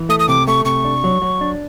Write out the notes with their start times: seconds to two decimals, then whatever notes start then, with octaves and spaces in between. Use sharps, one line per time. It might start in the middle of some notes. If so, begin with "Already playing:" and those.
Already playing: E3
0.09 A3 D#6
0.19 D#6
0.28 C3 D6
0.48 A3 C#6
0.65 C3 C#6
0.85 D4
1.04 F#3
1.22 F#3
1.41 D4